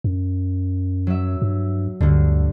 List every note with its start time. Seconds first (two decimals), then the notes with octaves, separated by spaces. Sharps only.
0.04 F#2
1.07 F#3 E5
1.42 G2
2.01 D2 G2 D3